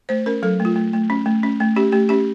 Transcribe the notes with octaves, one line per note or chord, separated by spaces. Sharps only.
A3 C5
C#4 A#4
F#3 A4
A3
F4
A3
A3
C#4
A3
C#4
A3
C#4 G4
A3 G4
C#4 G4